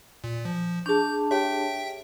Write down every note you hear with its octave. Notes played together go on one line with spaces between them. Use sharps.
A#2
F3
D4 G#4 A5 C#6 G6
G4 C#5 E5 G5